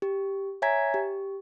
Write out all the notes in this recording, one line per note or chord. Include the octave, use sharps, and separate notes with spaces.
G4
C#5 E5 G#5 A#5 G#6 B6
G4